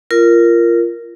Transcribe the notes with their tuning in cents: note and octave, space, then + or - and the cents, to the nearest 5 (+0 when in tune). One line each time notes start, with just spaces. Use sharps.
F4 -20 A#4 +0